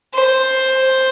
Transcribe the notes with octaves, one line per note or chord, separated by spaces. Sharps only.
C5